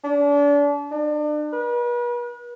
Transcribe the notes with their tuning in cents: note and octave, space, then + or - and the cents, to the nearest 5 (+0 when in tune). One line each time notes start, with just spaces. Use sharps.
D4 -35
D4 +35
B4 -40